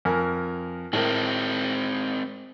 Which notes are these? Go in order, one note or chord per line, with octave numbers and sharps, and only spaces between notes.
F2 A#4 G#5
A2 G#3 C4 A#4